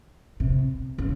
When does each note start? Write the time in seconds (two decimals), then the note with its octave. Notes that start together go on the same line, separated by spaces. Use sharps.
0.40 C3
0.98 C#3